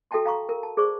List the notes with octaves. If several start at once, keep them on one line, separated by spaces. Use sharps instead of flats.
F#4 A4 E5 G5 A5 C6
F5 A#5 C#6
A#4
A5
G#4 C5 D5 C#6